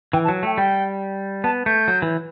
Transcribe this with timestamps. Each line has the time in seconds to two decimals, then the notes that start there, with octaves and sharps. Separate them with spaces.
0.13 E3 G5
0.24 A5
0.28 F#3
0.43 A3 G5
0.57 G3 G5
1.44 B3 A5
1.66 A3 G6
1.88 F#3
2.02 E3